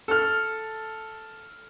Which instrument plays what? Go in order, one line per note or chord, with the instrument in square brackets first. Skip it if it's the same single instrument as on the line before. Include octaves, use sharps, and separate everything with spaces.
[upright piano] A4 F6